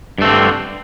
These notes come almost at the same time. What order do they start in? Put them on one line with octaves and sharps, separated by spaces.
G2 A3 C4 D3